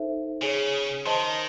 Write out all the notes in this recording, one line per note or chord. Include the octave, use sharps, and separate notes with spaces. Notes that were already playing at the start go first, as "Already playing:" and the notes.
Already playing: D#4 A4 C5 E5
C#3 G#4 C#5 G#5
D#3 C5 D#5 A5 C6